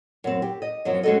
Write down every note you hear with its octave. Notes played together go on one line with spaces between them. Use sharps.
F#2 C4
G4
D#5
F#2 F3 F#3 C4
G#3 C#4 F#4 A4 D#5